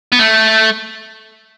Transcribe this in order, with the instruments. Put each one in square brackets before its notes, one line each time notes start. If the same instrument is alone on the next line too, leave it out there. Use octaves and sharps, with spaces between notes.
[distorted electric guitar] B3
A3